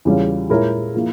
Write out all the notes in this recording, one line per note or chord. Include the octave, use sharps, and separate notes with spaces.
E2 C#3 G3 C#4 F4
A#2 G#3 E4 A#4 C#5
F3 A#3 E4